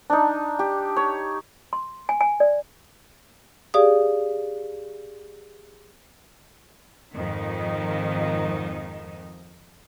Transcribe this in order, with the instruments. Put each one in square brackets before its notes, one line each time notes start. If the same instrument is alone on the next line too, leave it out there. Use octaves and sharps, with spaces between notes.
[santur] D4 D#4
G4
C#5
[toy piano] C6
G#5
G#5
D5
[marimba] G4 G#4 D5 F5 D#6
[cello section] F2 G#2 D#3 D#4